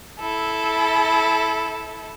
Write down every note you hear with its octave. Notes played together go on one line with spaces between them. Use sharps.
E4 A4